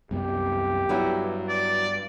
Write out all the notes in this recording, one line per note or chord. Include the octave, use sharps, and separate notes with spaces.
C2 F#2 B3 G4
G2 F#3 B3 E4
D5